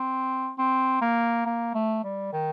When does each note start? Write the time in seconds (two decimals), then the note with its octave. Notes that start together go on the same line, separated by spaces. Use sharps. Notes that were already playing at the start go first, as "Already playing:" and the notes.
Already playing: C4
0.58 C4
1.02 A#3
1.46 A#3
1.74 A3
2.04 G3
2.33 D#3